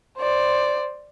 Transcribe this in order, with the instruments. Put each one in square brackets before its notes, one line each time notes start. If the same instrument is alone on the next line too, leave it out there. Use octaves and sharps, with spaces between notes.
[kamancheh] C5 D5